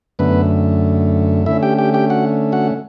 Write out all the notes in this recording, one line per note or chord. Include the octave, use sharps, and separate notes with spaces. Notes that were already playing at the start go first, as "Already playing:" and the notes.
F#2 D3 A3 B3 B4
D3 A3 C#4 E4 E5
G4 G5
G4 G5
G4 G5
F#4 F#5
F#4 F#5